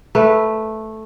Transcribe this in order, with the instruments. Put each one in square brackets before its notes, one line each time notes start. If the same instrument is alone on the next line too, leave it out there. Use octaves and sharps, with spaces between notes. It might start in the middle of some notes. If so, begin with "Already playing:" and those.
[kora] A3 B4